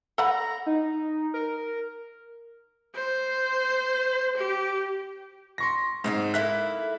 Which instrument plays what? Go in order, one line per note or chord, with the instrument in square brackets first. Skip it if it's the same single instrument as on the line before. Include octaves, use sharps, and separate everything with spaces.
[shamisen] A4 F#5 B5 [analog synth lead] A#5
[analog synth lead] D#4
A#4
[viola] C5
G4
[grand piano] C6 C#6 A#6
[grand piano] G#2 [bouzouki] C4 D4 C5
[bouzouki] A#3 E4 A4 [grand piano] F#6 B6